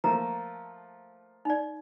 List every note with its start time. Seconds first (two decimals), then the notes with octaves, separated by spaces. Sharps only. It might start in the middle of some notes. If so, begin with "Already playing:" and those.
0.04 F3 A3 A#3 A#5
1.45 D#4 D5